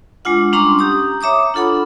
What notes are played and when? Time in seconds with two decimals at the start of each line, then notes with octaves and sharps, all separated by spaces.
0.25 G#3 D4 F4 F#5
0.53 G3 C#4 D4 A#5 C6
0.79 G4 A#5 D#6
1.21 C#5 E5 A#5 D6 D#6
1.54 D4 F4 A4 F#5 B5